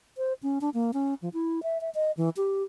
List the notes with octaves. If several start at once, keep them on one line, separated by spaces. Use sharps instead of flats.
C5
C#4
D4
A#3
C#4
F3
E4
E5
E5
D#5
E3
G4